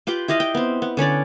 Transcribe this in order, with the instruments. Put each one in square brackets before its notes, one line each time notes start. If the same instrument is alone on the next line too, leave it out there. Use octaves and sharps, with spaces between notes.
[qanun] F4 G4 B4 G5
E4 G4 D#5 F5
G5
B3 C4
B3
D3 C#4 C#5 D5